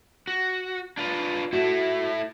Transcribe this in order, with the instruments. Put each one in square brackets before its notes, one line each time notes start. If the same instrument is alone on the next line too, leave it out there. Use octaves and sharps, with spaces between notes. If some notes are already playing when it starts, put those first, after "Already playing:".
[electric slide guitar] F#4
D4 F4 B4
[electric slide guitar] A3 E4 [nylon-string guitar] F#4